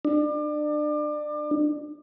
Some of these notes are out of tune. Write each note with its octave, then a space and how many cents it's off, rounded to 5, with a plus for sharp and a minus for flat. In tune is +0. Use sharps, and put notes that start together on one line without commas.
D4 +30